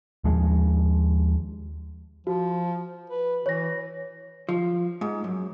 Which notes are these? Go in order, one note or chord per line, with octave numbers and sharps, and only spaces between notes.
D#2 F3 G#3
F3 F#4
B4
E3 C#5 A#6
F3
G#2
F#2